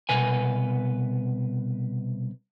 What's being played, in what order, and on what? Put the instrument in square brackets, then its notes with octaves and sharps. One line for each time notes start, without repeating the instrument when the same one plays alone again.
[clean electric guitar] C2 B2 B4 G#5